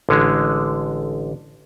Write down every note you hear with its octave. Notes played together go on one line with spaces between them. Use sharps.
A1 D3 G#3